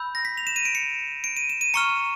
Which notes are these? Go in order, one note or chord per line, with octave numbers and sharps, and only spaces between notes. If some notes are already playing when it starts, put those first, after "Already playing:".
Already playing: B5 E6 G6
A#6
B6
F7
E7
D#7
D7
C#7
D7
D#7
E7
D#7
A#5 C#6 F6 C#7